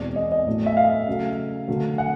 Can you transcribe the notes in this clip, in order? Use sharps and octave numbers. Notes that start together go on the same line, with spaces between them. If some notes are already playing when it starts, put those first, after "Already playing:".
Already playing: E2 B2 G#3 C4 D5
D#5
D#5
A2 F#3 A3
E5
F5
C#3 F#3 A3
D3 F#3 A3
F#5